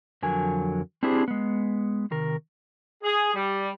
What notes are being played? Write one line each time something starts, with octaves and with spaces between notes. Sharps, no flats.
F2 D3 F#3 A#4 G#5
C4 D4 E4 G4 G#4 C5
G#3 B3
C3 D#3 A#4
G#4
G3